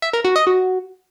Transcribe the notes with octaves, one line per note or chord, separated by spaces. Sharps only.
E5
A#4
F#4
D#5
F#4